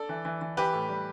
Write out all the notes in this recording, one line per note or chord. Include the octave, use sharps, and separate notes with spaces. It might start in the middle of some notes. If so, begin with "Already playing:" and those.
Already playing: A4 D5
E3
E3
E3
E3 G4 B4
A2
G3